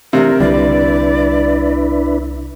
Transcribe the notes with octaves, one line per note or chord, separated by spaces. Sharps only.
C3 E3 A3 D4 A#4
C2 D3 G3 D4 E4 B4 D5